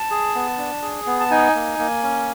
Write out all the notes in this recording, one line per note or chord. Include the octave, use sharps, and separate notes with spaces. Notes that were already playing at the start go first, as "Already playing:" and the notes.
Already playing: A5
G#4
B3
D4
G#4
B3
A5
D#4 G#5
A#3
A#3
C#4